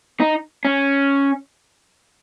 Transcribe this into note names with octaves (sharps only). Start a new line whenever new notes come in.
D#4
C#4